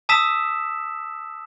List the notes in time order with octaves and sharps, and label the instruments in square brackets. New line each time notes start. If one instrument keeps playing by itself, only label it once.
[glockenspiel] A5 D#6 E6 B6 E7